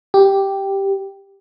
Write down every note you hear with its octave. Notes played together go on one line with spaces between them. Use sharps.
G4